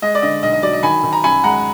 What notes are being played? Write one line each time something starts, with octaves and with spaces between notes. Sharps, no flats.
G#3 D#5
D5
D3 D#5
B1 D#5
D#5
F#3 D5
D#5
D#3 G#5 B5
D#3
A#5
F#2 G#5 B5
G#3 F#5 A#5